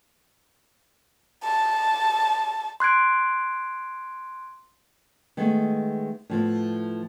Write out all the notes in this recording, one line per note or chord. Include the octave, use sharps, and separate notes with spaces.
A5
C6 F#6 G#6 D7
D#3 G#3 A3 B3
A2 F3 B3